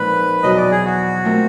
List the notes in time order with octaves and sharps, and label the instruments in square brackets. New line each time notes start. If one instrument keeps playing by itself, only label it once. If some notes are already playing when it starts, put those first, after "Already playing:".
Already playing: [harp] A#2 F3 G#3 C4 D#4 [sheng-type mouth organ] B4
[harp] E2 B2 F#3 [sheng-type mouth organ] D#5
[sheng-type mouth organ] D5
G#4
F#4
[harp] A3 C4 F4 A#4